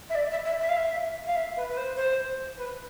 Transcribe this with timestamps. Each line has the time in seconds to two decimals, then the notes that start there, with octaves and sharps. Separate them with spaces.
0.09 E5
0.15 D5
0.30 E5
0.45 E5
0.60 E5
0.68 F5
0.76 E5
1.26 F5
1.35 E5
1.56 B4
1.69 B4
1.76 C5
1.96 C5
2.57 B4